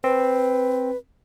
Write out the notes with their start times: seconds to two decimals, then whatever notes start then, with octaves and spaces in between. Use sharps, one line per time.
0.04 C4 B4